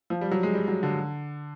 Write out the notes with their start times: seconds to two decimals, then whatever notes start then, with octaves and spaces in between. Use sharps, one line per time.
0.10 F3
0.21 G3
0.31 F#3
0.43 G#3
0.54 G3
0.68 F#3
0.83 D3